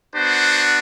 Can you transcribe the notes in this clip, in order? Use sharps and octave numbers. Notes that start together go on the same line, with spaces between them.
B3 D4 F#4 C5